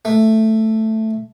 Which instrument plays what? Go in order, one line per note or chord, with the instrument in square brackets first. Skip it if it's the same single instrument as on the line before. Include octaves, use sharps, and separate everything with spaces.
[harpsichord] A3